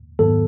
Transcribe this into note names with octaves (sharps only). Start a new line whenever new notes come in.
G#2 D#3 F#3 B3 A4